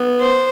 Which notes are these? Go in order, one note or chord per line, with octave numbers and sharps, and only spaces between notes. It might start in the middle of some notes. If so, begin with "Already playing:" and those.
Already playing: B3
C5